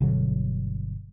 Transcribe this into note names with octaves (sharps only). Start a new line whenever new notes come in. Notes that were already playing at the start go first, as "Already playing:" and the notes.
G1 B2 D3 F#3